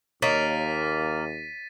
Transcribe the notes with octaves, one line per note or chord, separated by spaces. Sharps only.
D#2 A#3 C#5 D#5 A6 B6 D#7